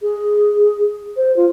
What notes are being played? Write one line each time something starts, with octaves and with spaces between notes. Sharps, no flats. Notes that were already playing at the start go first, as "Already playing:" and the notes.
G#4
C5
F4